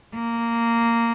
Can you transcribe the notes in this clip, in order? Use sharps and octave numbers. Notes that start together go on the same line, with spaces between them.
A#3